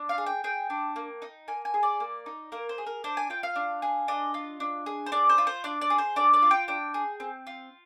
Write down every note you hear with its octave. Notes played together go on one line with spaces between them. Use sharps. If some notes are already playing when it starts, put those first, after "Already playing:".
Already playing: D4
F5
G#4
G5
G#4 G5
D4
A#3
D#4
A#3 G#5
G#5
G#4
D5
A#3
D#4
A#3 A#4
C5
G#4
A#4
D4 C5
G#5
F4 G5
F5
D4
G#4
D4 D#5
F4
D4
G#4
C5
D4 D5
C5
F4
C5
D4 D5
D5
G#4
C5
D4 D5
D5
F4
G5
D4 G5
G#4
C4
F4